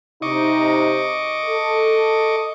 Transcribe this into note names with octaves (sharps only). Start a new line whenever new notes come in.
C3 D#4 D#5 C#6 D6
A4